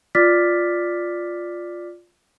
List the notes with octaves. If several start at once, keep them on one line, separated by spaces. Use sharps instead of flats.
F4 D5 D6 F6 A6 B6